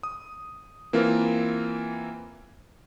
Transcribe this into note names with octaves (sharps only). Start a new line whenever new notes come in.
D#6
E3 A#3 C4 F4 A#4